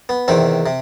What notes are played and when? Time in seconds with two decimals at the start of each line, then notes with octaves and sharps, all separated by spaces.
0.09 B3
0.28 E2 C3 D#3 C4
0.66 C3